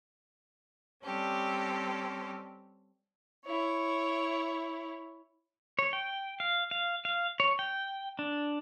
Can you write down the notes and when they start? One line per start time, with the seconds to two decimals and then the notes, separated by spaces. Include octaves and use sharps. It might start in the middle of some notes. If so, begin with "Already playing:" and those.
1.03 G3 C4 C#4 G4 A4
3.45 E4 C#5
5.79 C#5
5.93 G5
6.40 F5
6.71 F5
7.05 F5
7.40 C#5
7.59 G5
8.19 D4